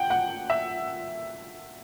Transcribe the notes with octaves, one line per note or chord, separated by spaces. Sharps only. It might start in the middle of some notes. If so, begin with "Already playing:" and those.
Already playing: F#5 G5
F#5
E5